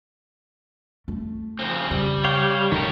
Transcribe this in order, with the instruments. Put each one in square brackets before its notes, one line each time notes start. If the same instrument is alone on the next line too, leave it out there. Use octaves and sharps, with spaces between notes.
[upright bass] A3
[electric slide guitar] C#3 F3 C4
[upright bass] C#3 [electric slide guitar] G3
[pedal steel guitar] C#5 F5 G5
[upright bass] G#1 E2 [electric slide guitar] G#2 A4 C#5 [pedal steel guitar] D#3 G4